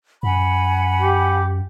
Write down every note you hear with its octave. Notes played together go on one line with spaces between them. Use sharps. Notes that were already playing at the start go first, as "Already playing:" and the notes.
F#2 F#5 G#5 B5
G4